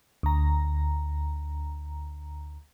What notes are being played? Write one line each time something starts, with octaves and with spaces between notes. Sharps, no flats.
D2 A#5